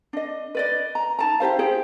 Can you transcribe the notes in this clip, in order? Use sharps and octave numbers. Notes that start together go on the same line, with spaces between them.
D4 D#5
B4 D5 D#5
A#5
D#4 A5 A#5
E4 G4 C5 F5
G4 G#4 C5 G5